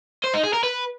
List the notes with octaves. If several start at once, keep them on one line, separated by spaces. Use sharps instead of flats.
C5
D#4
G#4
A#4
B4